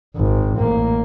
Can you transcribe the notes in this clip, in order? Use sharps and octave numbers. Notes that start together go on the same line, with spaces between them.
G#1
A1 A#3